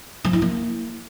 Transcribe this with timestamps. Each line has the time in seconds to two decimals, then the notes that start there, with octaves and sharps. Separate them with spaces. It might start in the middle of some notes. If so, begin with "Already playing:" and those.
0.24 F3
0.33 E4
0.42 A#3